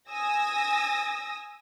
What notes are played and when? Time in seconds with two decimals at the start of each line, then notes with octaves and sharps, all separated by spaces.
0.11 G#5 D#6 E6 A#6